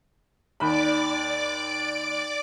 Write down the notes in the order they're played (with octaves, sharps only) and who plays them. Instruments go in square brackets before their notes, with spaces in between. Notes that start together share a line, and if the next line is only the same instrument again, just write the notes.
[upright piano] D#2 B5 [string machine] D5 D6